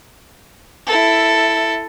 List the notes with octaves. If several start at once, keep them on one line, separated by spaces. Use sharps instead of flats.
E4 A4